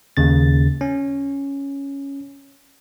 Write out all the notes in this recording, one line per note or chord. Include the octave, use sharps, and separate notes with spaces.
D#2 C#3 A6
C#4